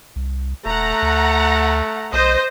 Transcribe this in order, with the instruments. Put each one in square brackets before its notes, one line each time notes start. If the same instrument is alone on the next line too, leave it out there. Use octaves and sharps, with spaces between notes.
[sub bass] C2
[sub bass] D#1 [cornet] A3 [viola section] F#5 A#5
[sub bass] D2
[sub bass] B1 [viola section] C5 D#5